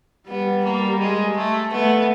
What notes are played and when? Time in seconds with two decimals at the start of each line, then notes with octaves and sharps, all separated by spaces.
0.28 G3 B3
0.64 A#3
1.00 G#3
1.36 A3
1.72 A3 B3